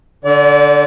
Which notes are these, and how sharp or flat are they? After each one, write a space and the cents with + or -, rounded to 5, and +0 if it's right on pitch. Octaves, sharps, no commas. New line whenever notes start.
D3 +0 D5 -40